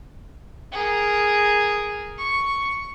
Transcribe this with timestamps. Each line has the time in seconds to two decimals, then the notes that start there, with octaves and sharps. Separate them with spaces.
0.72 G#4 A#4
2.18 C#6